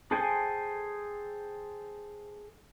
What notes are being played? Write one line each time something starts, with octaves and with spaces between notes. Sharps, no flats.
G#4 A4 C5 G5 G#5